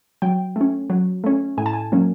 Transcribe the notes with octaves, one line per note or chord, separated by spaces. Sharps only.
F#3 G5
A3 C#4
F#3
A3 C#4
A2 G#5
A5
G#5
F#3 A#3 C#4